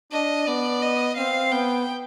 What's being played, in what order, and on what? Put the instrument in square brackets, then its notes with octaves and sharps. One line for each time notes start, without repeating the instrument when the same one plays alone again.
[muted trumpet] D4 [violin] D#5
[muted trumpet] B3 [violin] D5
[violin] D#5
[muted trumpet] C4 [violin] F5
[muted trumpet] B3 [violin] G5